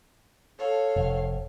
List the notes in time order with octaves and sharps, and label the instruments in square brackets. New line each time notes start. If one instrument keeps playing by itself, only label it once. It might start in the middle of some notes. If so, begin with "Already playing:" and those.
[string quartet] A4 C#5 F5
[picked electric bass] F1